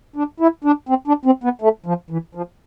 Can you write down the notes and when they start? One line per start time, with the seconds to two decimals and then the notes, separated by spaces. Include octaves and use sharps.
0.16 D4
0.40 E4
0.64 D4
0.89 C4
1.07 D4
1.25 C4
1.44 B3
1.62 A3
1.86 F3
2.10 E3
2.35 F3